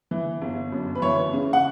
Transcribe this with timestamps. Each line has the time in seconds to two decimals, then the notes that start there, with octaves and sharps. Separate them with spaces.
0.11 E3
0.42 G1
0.72 F#2
0.95 B4
1.02 E3 C#5
1.33 C#3
1.53 F#5